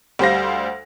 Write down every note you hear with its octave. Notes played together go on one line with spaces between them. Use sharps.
D2 G3 C5 F5 A#6